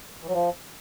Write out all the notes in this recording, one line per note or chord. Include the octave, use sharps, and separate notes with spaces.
E3
F#3
F3